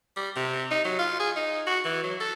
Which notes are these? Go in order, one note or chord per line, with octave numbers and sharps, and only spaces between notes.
G3
C3
D#4
F#3
F4
G#4
D#4
F#4
E3
F#3
A4